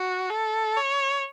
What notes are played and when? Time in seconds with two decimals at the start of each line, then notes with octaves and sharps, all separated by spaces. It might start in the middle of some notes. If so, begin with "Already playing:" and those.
Already playing: F#4
0.30 A4
0.77 C#5